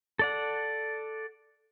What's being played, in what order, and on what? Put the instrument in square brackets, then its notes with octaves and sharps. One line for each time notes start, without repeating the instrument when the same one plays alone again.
[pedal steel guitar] A4 D5 F#5